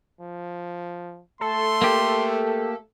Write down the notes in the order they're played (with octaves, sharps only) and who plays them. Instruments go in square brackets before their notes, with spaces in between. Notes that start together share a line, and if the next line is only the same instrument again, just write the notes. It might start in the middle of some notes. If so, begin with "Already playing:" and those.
[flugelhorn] F3
[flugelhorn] A3 [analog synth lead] A4 [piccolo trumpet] C6
[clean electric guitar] A#3 G4